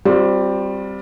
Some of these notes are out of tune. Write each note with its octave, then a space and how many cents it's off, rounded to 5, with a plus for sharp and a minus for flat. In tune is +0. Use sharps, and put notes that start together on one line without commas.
G3 +0 C4 +0 F4 +40